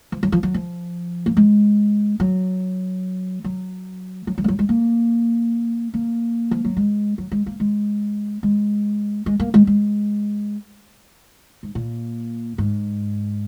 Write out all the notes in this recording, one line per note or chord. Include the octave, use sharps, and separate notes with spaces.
F3
F#3
F3
F#3
F3
A#3
G#3
F#3
F#3
F#3
F#3
G#3
F#3
G#3
A#3
A#3
F3
F#3
G#3
F#3
G#3
A#3
G#3
G#3
G#3
A#3
G#3
G#3
G#2
A#2
G#2